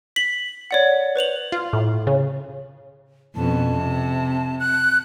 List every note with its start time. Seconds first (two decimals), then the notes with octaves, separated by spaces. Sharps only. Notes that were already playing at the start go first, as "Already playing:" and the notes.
0.16 B6 F#7
0.71 C#5 D5 F#5
1.16 B4 C5 F7 F#7
1.52 F4
1.73 A2
2.07 C#3
3.36 F2 B2 C#4 A5
3.77 C3
4.60 F#6